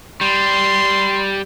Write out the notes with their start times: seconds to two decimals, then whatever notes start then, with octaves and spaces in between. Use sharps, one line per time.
0.21 G3 C6